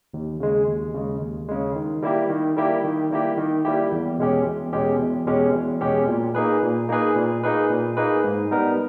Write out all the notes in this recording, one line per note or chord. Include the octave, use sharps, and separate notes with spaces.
D#2
C#3 G#3
D#2
C#3 G#3
D#2
C#3 G#3
D#3
G3 A#3 E4 G4
D#3
G3 A#3 E4 G4
D#3
G3 A#3 E4 G4
D#3
G3 A#3 E4 G4
E2
B2 G#3 C#4 G4
E2
B2 G#3 C#4 G4
E2
B2 G#3 C#4 G4
E2
B2 G#3 C#4 G4
A#2
A#3 D#4 G#4 B4
A#2
A#3 D#4 G#4 B4
A#2
A#3 D#4 G#4 B4
A#2
A#3 D#4 G#4 B4
G#2
G3 B3 D#4 A#4